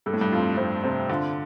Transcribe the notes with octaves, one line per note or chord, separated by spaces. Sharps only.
G2 A4
A2
G2
F2 F4
G2 C4
C3 C4
D3 F4